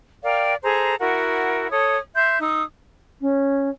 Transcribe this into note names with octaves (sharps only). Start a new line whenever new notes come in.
A#4 D5 F5 G5
G#4 A4 C5 A#5
E4 F#4 A#4 F#5
A4 C#5 D#6
E5 C6 G6
D#4 D#6 E6
C#4